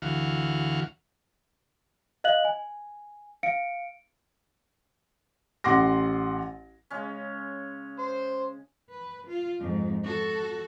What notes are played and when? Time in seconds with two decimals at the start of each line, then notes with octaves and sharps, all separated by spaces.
0.02 D2 E3 F#4 F5
2.24 D#5 F5 F#6 F#7
2.45 G#5
3.43 F5 C#7 D7
5.64 A1 F#5 C6 D6 A#6
6.90 C#3 G#3 C#4
7.99 C5
8.90 B4
9.27 F4
9.59 F2 G#2
10.03 F#4 A4